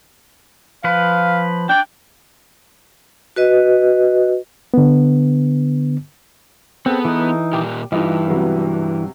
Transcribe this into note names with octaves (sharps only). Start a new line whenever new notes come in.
F3 B4 F5
D4 D5 G5
F#4 B4 D#5
D3 B3
B3 C4 G#4 A4
E3 D#4
A#2 G4 G5 D6
G2 E3 D#4 F4 D#5
C3 F#3 B3